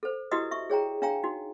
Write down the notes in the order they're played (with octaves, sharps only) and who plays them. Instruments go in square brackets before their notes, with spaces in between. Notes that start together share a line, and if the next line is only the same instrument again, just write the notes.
[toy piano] A4 C5
E4 F#4 G4 B4 D#5 D#6
E5 C#6
G#4 C#5 G5 A#5
D4 C#5 F5 G5 A#5
D#4 F#4